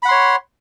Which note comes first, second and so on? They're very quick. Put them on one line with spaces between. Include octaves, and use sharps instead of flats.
B5 F#5 C6 C#5